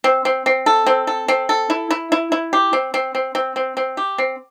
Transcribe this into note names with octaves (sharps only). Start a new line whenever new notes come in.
C4
C4
C4
A4
C4
A4
C4
A4
E4
E4
E4
E4
G4
C4
C4
C4
C4
C4
C4
G4
C4